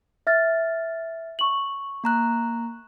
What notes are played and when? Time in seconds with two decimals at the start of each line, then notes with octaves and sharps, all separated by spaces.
0.27 E5 F6 A6
1.39 C#6 F#7
2.04 A#3 A#5 F#6